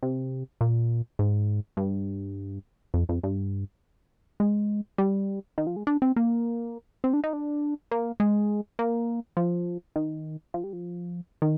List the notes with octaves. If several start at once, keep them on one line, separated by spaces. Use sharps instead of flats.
C3
A#2
G#2
G2
F2
F2
G2
G#3
G3
D#3
F3
G#3
D4
C4
A#3
C4
D4
D#4
D4
A#3
G#3
A#3
F3
D#3
F3
G3
F3
D#3